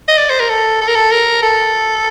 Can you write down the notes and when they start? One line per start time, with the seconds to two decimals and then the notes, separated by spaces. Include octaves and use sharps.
0.08 D#5
0.18 D5
0.29 C5
0.40 A#4
0.49 A4
0.81 A4
0.88 A#4
0.95 A4
1.11 A#4
1.43 A4